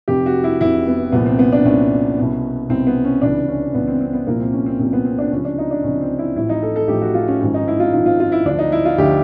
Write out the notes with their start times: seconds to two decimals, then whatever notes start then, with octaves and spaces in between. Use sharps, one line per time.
0.08 F1 F2 C3 G4
0.26 F#4
0.44 E4
0.61 F1 F2 C3 E4
0.87 B3
1.12 C2 A#2 F3 B3
1.26 C4
1.39 B3
1.53 D4
1.65 C2 A#2 F3 C#4
2.18 C2 B2
2.69 C2 B2 C4
2.87 B3
3.05 C#4
3.22 C#2 C3 E3 D4
3.48 C#4
3.74 C#2 C3 E3 B3
3.88 C4
4.01 C4
4.13 B3
4.27 C2 A#2 F3 A#3
4.40 C4
4.53 C#4
4.66 C4
4.79 C2 A#2 F3 C4
4.93 B3
5.05 C4
5.18 D4
5.32 C#2 C3 F3 C#4
5.45 D4
5.58 D#4
5.71 D4
5.83 C#2 C3 F3 C#4
6.01 C4
6.18 E4
6.36 A1 A2 F3 E4
6.49 D#4
6.63 A4
6.76 A4
6.88 A1 A2 F3 G4
7.02 F#4
7.14 F4
7.28 C#4
7.41 G#1 G#2 F3 C#4
7.54 D#4
7.68 E4
7.80 F4
7.93 G#1 G#2 F3 F4
8.06 F4
8.20 F4
8.32 E4
8.45 D2 D3 F3 D4
8.59 D#4
8.72 E4
8.85 F4
8.98 D2 D3 F3 G4